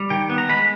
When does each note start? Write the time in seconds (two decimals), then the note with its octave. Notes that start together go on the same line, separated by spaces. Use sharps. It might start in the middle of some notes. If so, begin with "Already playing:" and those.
Already playing: G3
0.10 D#3 G5
0.30 B3
0.38 A#5
0.49 G#3 B5